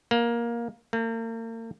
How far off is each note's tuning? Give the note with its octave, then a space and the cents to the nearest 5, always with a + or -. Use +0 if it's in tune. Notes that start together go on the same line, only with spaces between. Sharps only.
A#3 +15
A#3 -40